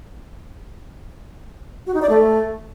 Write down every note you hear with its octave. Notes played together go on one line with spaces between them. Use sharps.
F#4
D#4
D5
A3